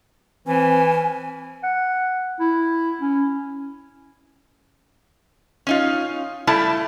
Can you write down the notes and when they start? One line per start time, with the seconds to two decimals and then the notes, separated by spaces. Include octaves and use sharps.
0.47 E3 C4 G#5
1.63 F#5
2.40 E4
3.02 C#4
5.67 C#4 D#4 F4
6.47 G3 A3 E4 A5